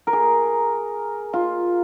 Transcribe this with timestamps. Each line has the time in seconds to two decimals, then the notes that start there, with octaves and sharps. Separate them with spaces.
0.07 A#4
0.13 G#4
1.33 F4